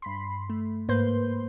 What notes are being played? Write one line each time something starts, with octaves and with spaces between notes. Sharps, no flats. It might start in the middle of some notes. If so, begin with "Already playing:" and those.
G2 B5 C6
A3
G#2 A#3 B4 C5 C6 G6